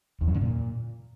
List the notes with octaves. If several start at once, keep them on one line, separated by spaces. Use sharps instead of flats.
E2
F#2
D3
A#2